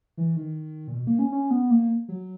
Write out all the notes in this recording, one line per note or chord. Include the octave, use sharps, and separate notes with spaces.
E3
D#3
A#2
B2
A#3
C#4
C#4
B3
A#3
F#3